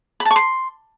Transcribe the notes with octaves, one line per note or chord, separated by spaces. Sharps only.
B5
A5
C#6
C6